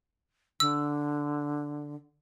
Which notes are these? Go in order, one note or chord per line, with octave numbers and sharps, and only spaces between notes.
D3 E6